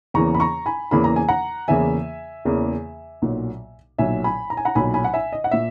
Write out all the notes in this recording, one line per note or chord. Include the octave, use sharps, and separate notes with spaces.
E2 C#3 E3 A#3 A#5 C#6
B5
A#5 C#6
G#5 B5
E2 C#3 E3 A#3 B5
A#5
G#5
F#5 A#5
E2 C#3 E3 A#3 E5 G#5
E2 C#3 E3 A#3
B1 A#2 F#3
B1 A#2 F#3 E5 G#5
G#5 B5
A#5
G#5
F#5 A#5
B1 A#2 F#3 G#5 B5
G#5 B5
F#5
E5 G#5
D#5
F#5
A#2 E5